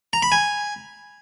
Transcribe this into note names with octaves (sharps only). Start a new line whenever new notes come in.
A#5
B5
G#5